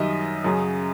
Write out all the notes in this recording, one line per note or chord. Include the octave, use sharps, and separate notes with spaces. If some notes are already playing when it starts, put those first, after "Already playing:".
Already playing: F#2 D#3 G3 D#5 E5
F#2 C#3 F#3